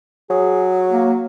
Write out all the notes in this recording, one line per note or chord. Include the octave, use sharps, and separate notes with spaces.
F#3 G#4
A#3